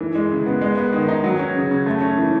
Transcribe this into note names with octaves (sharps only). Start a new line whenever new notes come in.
E3
G#3
C#3
B3
G#3
B3
D#3
D#4
F#3
C#4
C#3
C#3
A3
C#4
E3